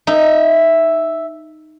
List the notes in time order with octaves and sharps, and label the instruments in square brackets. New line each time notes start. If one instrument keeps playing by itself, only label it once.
[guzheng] D#4 [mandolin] E5